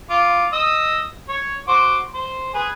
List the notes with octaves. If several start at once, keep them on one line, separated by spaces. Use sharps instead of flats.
F4 D6
D#5 D#6 E6
C#5
F#4 C5 D6
C5
G#4 B4